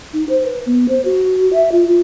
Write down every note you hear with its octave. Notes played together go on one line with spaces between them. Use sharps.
D#4
C5
B4
B3
C5
F#4
E5
F4
F4